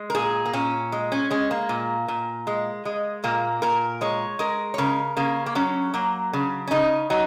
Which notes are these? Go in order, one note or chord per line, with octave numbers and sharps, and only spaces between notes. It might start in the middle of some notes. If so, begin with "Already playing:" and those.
Already playing: G#3
A#4
A#2 G#4
A#3
A#2 C#4
G#3
C#4
G#3 C#4
A#3
A#2
A#2
G#3
G#3
A#2 A#3
A#2 A#4
G#3 C#5
G#3 A#4
C#5
C#3 A#4
C#3 A#3
A#3
F#3 C#4
F#3 A#3
C#3
C#4
C#3 D#4
F#3 D#4